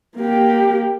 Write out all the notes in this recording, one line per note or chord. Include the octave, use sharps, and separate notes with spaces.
A#3 G4